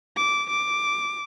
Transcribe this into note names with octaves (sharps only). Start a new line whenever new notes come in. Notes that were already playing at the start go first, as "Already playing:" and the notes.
D6
D6